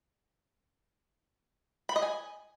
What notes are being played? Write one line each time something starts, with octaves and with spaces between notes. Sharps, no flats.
B5
D#5
G#5